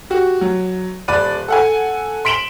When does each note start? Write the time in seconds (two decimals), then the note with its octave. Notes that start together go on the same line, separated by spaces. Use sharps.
0.10 F#4 G4
0.41 F#3
1.08 D#1 D5 B5 F#6 D#7
1.48 A4 F#5 G#5
2.25 C6 B6 D7 E7 F#7 G7